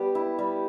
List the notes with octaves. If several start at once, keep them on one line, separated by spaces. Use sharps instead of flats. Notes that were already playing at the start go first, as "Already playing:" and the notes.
Already playing: G3 B3 G4
E4
G3